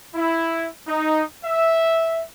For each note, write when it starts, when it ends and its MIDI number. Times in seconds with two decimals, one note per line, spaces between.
0.15 0.68 64
0.87 1.23 63
1.45 2.23 76